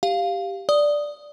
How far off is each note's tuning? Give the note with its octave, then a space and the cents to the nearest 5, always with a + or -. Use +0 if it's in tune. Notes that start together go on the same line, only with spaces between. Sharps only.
G4 +0 F5 +0
D5 +0 D#6 +0